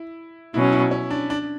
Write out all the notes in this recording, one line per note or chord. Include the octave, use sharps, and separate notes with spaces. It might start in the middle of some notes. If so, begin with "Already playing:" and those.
Already playing: E4
B2 F#3 C#4 E4
E4
C#4
D4
D4